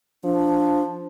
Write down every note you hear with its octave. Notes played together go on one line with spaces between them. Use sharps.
F3 D4